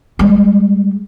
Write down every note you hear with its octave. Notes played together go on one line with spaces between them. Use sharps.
G3 G#3